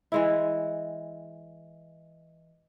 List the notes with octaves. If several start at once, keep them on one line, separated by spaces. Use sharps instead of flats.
E3 G#3 E4